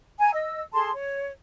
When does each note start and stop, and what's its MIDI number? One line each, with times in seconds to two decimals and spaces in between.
0.20 0.31 80
0.20 0.31 82
0.33 0.61 75
0.33 0.61 88
0.72 0.90 68
0.72 0.90 69
0.72 0.90 81
0.72 0.90 84
0.92 1.31 73